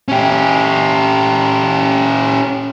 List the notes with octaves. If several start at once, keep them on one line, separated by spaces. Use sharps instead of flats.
C#4 G4